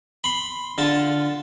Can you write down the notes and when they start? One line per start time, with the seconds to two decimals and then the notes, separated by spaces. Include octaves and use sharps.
0.24 B5 C6
0.78 D3 F4 A5